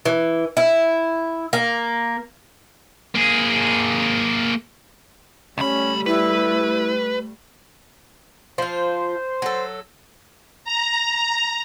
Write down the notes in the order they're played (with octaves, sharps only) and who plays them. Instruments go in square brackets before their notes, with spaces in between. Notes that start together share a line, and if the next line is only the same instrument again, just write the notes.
[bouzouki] E3
E4
A#3
[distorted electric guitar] A#3 G#4
[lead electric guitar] C#2 B5 [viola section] G3 A3 [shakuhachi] C#4
[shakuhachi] E4 [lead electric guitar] B4
[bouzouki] F3 F4 [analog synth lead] C5
[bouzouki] F#3 A4
[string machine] A#5